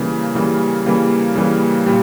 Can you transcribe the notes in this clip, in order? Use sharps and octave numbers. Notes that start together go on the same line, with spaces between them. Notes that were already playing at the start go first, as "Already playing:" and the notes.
Already playing: C#3 E3 G3 A#3
C#3 E3 G3 A#3
C#3 E3 G3 A#3
C#3 E3 G3 A#3
A#2 G3